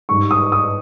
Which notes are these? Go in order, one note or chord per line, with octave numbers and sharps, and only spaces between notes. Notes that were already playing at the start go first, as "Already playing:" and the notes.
G#2 G3 C#6
D#6
D#6